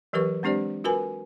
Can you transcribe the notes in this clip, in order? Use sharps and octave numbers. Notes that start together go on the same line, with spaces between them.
E3 F#3 G4 A#4 B4 C#6
G#3 C4 D4 G4 C5 D5
F4 F#4 A#4 B4 G#5 B5